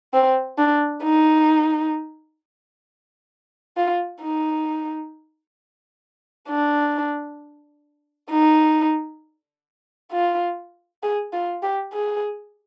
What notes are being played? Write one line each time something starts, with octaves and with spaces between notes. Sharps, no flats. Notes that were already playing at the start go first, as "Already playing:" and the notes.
C4
D4
D#4
F4
D#4
D4
D#4
F4
G#4
F4
G4
G#4